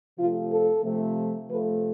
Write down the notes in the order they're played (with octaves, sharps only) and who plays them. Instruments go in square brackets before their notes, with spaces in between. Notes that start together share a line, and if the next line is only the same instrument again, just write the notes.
[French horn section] C3 F3 A3 F4
A4
C3 F3 A3
C3 F3 A3 B4